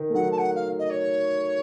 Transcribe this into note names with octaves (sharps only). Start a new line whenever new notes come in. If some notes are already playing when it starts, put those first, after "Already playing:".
Already playing: D#3
A3
F#3 F#5
A5
F#5
F5
D#5
C#5